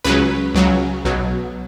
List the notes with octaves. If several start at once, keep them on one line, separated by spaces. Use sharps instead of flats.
C#2 C#3 F#3 B4
C#2 C#3 F#3
B1 B2 F#3